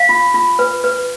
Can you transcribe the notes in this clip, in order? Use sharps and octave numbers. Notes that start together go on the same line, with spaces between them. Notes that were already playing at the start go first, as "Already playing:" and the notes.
Already playing: F5
F4
F4
B4
B4